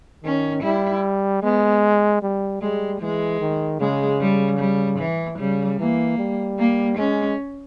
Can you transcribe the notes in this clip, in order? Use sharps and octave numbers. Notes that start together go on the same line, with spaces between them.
D#3 C#4
G3 E4
G#3 B3
G3
G3 G#3
E3 G#3
D#3
C#3 G#3
G3
G3
E3
C#3 G3
E3 A#3
G3
A#3
G#3 C#4